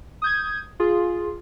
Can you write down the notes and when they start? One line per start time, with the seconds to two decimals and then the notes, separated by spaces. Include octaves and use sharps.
0.22 D#6 G6 G#6
0.80 F4 G#4